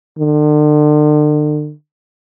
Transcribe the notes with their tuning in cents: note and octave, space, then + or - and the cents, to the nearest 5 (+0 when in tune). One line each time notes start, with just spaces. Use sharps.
D3 +40